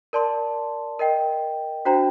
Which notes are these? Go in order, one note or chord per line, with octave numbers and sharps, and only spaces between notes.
A#4 D5 A5 C6
A#4 D#5 G5
D4 F#4 C5 G5 A#5